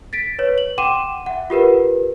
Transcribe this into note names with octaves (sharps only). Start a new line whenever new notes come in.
A6 B6 D7
B4 C#5
F#7
F#5 G5 C6 D6 D#7 E7
E5 F#5
F4 G4 A#4 B4